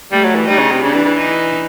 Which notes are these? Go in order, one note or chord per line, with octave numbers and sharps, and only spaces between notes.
G3 A3
F#3
E3
G3 D#4
C#3
C3
C#3 D4
E3
E3
D#4